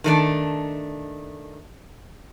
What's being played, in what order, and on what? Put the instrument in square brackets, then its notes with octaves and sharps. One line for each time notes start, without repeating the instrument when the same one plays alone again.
[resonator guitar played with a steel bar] D#3 A3 D4